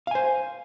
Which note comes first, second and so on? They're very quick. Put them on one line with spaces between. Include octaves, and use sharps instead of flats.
F5 G#5 C5